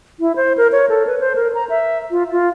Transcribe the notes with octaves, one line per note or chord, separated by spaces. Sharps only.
E4
C5
A#4
C#5
A4
B4
C5
A#4
A#5
E5
F4
F4